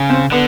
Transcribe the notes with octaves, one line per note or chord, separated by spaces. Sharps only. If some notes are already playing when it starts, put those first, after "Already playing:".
Already playing: C#3
C4
D3 B3